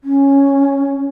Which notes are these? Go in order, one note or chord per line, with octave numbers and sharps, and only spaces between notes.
C#4